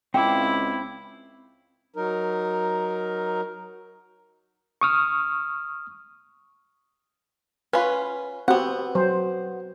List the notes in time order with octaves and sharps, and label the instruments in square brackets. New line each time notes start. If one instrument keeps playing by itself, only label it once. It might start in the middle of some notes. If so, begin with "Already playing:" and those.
[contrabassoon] C#2 [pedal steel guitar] C4 F5 D6 [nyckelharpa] E4 [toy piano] G5
[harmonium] F#3 D#4 A#4
[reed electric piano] C#6 D#6 F6
[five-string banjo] C#4 F4 [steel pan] B4
[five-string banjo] B3 F#5 [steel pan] C4 F#4 G4
[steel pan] F#3 C5